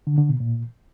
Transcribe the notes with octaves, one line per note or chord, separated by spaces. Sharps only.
D3
D3
B2
A#2